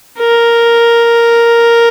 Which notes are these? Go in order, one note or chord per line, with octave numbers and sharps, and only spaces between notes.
A#4